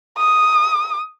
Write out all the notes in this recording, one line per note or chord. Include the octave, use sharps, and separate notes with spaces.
D#6